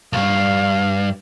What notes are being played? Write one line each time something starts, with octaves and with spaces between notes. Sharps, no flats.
C2 G2 F5